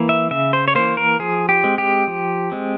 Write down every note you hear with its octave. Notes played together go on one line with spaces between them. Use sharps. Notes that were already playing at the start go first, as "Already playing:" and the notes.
Already playing: E3 A#3
E5
C#3 E5
C5
C#5
E3 A#3 C5
A#4
F3 G#4
G4
G#3 C4
G4
F3
G#3 C4